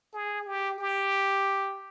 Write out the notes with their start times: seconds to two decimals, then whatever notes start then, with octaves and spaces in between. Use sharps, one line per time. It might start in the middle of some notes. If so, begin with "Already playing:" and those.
0.13 G#4
0.46 G4
0.79 G4